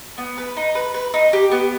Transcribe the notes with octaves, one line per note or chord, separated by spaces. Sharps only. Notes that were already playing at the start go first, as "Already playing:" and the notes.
B3
B4
D#4
B4
B4
D#4
G4
B3